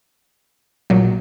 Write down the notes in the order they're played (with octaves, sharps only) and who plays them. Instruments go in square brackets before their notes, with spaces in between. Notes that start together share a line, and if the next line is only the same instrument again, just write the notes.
[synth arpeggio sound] A#1 A#2 F#3